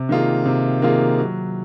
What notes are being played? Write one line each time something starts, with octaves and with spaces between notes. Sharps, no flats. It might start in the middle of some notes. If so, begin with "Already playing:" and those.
Already playing: C3
D#3 A#3 F4 G#4
C3
D#3 A#3 F4 G#4
F#3